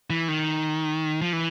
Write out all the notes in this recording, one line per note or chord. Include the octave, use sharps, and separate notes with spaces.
E3
D#3
F3
E3